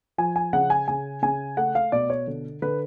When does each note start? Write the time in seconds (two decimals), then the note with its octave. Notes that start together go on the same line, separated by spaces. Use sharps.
0.18 F3 G#5
0.36 G#5
0.53 C#3 F#5
0.70 G#5
0.88 C#3 G#5
1.22 C#3 G#5
1.57 A3 F#5
1.75 F5
1.92 B2 D5
2.10 C#5
2.27 D3
2.62 D3 B4